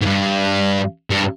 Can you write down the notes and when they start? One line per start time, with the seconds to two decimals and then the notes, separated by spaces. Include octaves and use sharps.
0.01 G#2
0.06 G2
1.10 G2